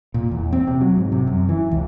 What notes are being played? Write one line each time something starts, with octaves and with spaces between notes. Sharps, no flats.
A#2
E2
C4
C3
F#3
G#2
C3
F#2
E3
C#2